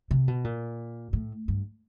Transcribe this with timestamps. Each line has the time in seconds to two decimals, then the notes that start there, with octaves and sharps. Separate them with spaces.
0.11 C3
0.28 B2
0.44 A#2
1.13 A2
1.48 G2